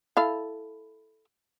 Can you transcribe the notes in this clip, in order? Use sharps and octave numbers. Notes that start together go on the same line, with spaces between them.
E4 A4 F5